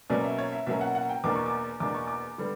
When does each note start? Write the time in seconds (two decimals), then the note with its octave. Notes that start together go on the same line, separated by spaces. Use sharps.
0.10 B2 F#3 A#3 C#4 D5
0.24 E5
0.38 C#5
0.53 E5
0.66 B2 F#3 A#3 C#4 E5
0.81 F#5
0.95 F#5
1.09 G5
1.24 E2 B2 A#3 D4 D6
1.35 C#6
1.46 D6
1.80 E2 B2 A#3 D4 D6
1.95 C#6
2.08 D6
2.38 D3 G3 B3